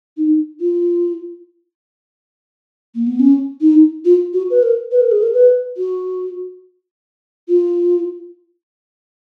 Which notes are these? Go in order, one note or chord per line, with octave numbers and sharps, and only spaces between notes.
D#4
F4
A#3
B3
C#4
D#4
F4
F#4
B4
A#4
B4
A#4
G#4
A#4
B4
F#4
F4